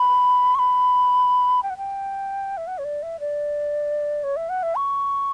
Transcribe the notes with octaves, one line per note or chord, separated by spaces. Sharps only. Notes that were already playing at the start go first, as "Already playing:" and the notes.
Already playing: B5
C#6
B5
G5
F#5
G5
E5
F#5
C#5
D5
E5
D5
C#5
E5
F#5
E5
C#6